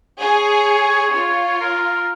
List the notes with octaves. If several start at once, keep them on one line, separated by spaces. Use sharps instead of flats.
G#4 C#5
F4
A#4